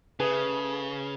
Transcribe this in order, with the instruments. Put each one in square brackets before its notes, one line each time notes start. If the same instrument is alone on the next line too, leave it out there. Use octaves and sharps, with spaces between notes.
[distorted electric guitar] C#3 [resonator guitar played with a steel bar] A3 G#4 [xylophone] B4